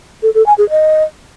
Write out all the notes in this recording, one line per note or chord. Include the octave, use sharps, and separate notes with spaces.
A4
A4
G#5
G#4
D#5